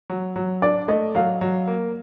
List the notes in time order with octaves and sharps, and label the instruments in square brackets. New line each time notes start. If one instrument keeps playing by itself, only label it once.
[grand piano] F#3
F#3
[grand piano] D4 [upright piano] D5
[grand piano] A3 [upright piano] D#5
[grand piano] F#3 [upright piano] F5
[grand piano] F#3
A#3